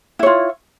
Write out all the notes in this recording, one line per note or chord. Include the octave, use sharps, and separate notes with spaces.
E4 F4 C#5